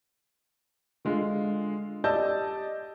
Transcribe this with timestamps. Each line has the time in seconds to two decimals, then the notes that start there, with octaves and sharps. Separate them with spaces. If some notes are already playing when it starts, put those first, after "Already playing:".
1.05 D3 G#3 F4
2.04 G4 D5 D#5 A5 E6 G6